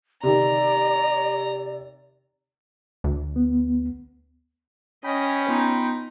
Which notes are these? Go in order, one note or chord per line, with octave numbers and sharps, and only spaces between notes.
C3 D#3 D5 A#5
D2
B3
C#4 D#5 G5 B5
B3 D#4 F4 C6